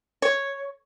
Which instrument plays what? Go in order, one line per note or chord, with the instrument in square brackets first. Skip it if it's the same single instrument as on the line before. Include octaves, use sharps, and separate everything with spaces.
[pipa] C#5